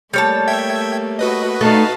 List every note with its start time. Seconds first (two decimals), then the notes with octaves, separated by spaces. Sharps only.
0.14 G3 A3 A#3 C#5 A5
0.48 E5 G5 G#6
1.19 F#4 B4 D#5
1.61 A3 D#4 F5 A5